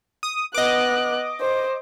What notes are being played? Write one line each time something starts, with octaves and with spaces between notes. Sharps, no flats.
D#6
B3 D#5 D6 F#6
C5